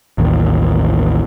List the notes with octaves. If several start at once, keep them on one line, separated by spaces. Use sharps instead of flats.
A1 D#2